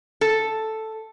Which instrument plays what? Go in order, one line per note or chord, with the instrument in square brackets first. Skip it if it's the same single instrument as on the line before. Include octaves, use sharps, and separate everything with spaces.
[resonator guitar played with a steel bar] A4